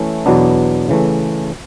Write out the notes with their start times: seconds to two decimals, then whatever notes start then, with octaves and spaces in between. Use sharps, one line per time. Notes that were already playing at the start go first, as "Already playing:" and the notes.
Already playing: E3 A3 C#4 E4 A4
0.26 E2 B2 F#3 B3 D4
0.89 C#3 E3 A3